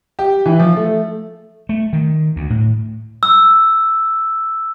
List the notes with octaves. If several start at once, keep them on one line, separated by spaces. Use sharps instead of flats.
G4
E3
F3
A3
A3
D#3
D2
A2
E6